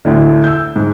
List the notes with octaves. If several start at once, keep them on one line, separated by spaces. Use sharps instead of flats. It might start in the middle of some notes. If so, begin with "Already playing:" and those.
D2 A2 D3
E6 G6
G#2